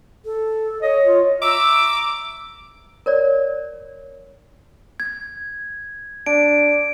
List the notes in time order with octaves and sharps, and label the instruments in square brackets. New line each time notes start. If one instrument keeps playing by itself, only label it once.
[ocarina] A4
[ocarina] C#5 [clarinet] D#5
[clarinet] F4
[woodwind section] E5 A#5 E6 [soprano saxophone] D6
[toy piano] A#4 C#5 D5
[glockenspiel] G#6
[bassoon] D4 [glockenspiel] D7